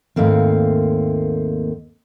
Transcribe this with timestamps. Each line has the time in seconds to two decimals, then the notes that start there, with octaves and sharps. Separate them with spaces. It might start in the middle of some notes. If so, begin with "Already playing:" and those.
0.16 D#2 G#2 A3 A#3 C4